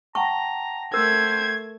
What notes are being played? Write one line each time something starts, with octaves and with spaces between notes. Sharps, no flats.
F#5 G5 A5 A#5 C#6
A3 A#4 C5 G#6